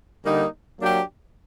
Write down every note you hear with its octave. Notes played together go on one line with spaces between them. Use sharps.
D3 G3 A#3 D#4
F#3 A#3 D4 G4